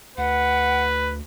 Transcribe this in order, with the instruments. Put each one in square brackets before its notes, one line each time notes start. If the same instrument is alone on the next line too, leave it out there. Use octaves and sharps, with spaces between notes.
[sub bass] D2 [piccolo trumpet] B4 [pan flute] F#5